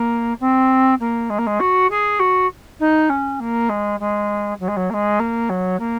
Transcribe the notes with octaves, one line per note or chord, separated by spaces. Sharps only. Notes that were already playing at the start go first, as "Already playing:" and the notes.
Already playing: A#3
C4
A#3
G#3
A#3
G#3
F#4
G#4
F#4
D#4
C#4
A#3
G#3
G#3
F#3
G#3
F#3
A#3
G#3
A#3
F#3
A#3